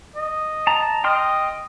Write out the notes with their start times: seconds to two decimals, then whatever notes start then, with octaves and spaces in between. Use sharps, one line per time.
0.16 D#5
0.67 A5 A#5
1.04 D#5 G5 C6 F6